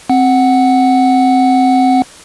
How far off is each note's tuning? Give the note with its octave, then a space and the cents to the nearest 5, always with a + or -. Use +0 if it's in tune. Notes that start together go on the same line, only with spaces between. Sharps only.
C4 +5 F#5 +0